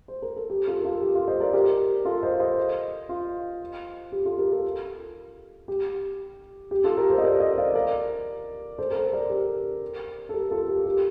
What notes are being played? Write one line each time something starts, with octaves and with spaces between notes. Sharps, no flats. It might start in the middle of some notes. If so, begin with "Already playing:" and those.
C5
A#4
A4
G4
F4 A4
A#4
F4 A4
G4
F4
C5 D#5
A#4 D5
G4 A#4
F4 A4
C5 D#5
C5 D#5
F4
G4
F4 A4
G4 A#4
F4 A4
G4
G4
F4 A4
G4 A#4
A4 C5
D#5
A#4 D5
C5 D#5
D5 F5
A#4 D5
A4 C5
A#4
A4 C5
A#4 D5
G4 A#4
A4
G4 A#4
F4 A4
G4
G4